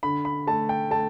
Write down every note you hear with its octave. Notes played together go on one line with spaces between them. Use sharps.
D3 B5
B5
A3 A5
G5
A3 A5